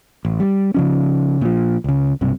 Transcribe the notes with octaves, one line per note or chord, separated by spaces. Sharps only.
A1
G3
C#3 F3 C#4
A#2 F3
C#2 C#3
B1 G2 C3